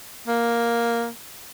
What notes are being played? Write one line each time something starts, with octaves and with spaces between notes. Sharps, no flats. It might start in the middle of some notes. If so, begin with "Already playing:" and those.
A#3